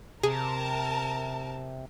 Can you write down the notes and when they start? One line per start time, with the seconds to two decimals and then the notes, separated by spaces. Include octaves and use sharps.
0.23 C3 G#4 A#4 A5